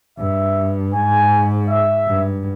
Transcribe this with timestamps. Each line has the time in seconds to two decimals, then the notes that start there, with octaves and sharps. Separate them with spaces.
0.19 G2 E5
0.94 G#2 G#5
1.70 E5
2.08 G2